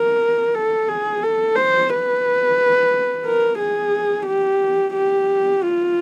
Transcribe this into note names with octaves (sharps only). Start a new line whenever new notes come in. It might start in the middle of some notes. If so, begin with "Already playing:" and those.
Already playing: A#4
A4
G#4
A4
C5
B4
A#4
G#4
G4
G4
F4